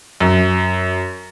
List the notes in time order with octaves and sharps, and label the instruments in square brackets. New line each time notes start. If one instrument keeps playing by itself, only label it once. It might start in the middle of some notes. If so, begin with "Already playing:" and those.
[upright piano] F#2